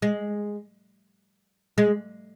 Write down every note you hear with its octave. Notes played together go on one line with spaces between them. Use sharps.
G#3
G#3